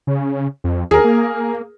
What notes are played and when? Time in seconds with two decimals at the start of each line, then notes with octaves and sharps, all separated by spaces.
0.07 C#3
0.64 F2
0.91 D#2 G#4 A#4
1.04 A#3